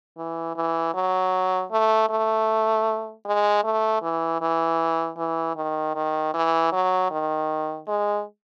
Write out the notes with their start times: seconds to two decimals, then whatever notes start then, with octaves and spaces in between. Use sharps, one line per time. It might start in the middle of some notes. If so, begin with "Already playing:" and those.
0.17 E3
0.55 E3
0.94 F#3
1.72 A3
2.10 A3
3.25 G#3
3.64 A3
4.03 E3
4.41 E3
5.18 E3
5.56 D#3
5.95 D#3
6.34 E3
6.72 F#3
7.11 D#3
7.88 G#3